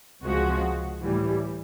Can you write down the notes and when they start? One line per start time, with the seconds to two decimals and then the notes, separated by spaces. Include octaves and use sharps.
0.23 C#2 C3 F3 G#3 F#4
1.02 A2 E3 G3